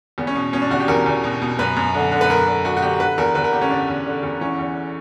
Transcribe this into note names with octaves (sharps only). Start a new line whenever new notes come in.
E2 B3
C#4
B2
B2 C#4
D4
E2 F#4
G4
E2 A#4
E2
B2
B2
F#2 B4
F#2
D3
D3
B4
F#2 A#4
D3
D3 F#4
F#4
D3 G4
D3 B4
E2 A#4
E2 B4
A#4
D3 G4
C#4
D3 D4
E2
D3
E2
E3 C#4
E2